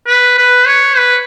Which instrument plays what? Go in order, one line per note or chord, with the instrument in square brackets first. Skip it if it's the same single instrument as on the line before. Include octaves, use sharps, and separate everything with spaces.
[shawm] B4
B4
C#5
B4